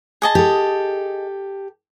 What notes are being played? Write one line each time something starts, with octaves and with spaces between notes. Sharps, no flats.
G#4 D#5 A5
G4 A4